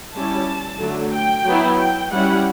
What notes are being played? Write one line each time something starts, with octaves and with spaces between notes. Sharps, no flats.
G3 C#4 E4 A5
D3 F#3 A3
G5
F#3 B3 E4
G5
G3 C#4 E4 F#5